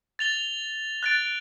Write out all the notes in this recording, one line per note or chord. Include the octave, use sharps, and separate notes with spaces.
A6 F7 G7
F#6 A6 D7